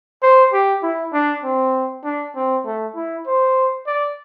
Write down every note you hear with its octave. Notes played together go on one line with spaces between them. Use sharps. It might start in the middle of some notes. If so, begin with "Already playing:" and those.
C5
G4
E4
D4
C4
D4
C4
A3
E4
C5
D5